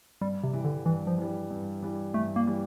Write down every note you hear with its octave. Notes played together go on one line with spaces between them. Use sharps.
G2 G3
C3
E3 G3
D3
G2 E3
F3
E3 G3
G2
E3 G3
G2 A3
A#3
E3 G3